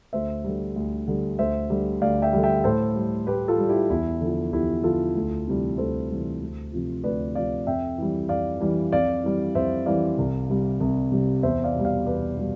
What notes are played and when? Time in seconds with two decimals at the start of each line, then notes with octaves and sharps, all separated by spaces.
0.13 D2 C5 E5
0.44 D3 G3
0.76 D2
1.08 D3 G3
1.39 D2 C5 E5
1.70 D3 G3
2.01 D2 D5 F5
2.22 E5 G5
2.33 D3 G3
2.43 E5 G5
2.64 A2 A4 C5
2.95 G3
3.27 A2 G4 B4
3.48 F4 A4
3.58 G3
3.69 E4 G4
3.90 E2 E4
4.21 D3 F3
4.53 E2 E4 G4
4.84 D3 F3 F4 A4
5.15 D2
5.47 C3 E3 G3
5.78 D2 A4 C5
6.10 C3 E3 G3
6.41 D2
6.73 C3 F3
7.04 D2 B4 D5
7.35 C3 F3 D5 F5
7.67 F2 E5 G5
7.98 E3 G3
8.29 F2 D5 F5
8.61 E3 G3
8.92 F2 D5 F5
9.24 E3 G3
9.55 F2 C5 E5
9.86 E3 G3 D5 F5
10.18 C2
10.50 C3 G3
10.80 C2
11.12 C3 G3
11.43 E2 C5 E5
11.64 D5 F5
11.75 B2 G3
11.85 D5 F5
12.06 E2 B4 D5
12.37 B2 G3